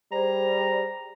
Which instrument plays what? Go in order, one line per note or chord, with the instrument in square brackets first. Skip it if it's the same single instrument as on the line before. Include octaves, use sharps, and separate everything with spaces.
[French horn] G3 [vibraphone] G#4 C5 [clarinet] A#5